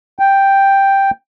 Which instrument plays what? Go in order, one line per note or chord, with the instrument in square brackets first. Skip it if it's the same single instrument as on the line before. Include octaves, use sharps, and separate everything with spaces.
[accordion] G5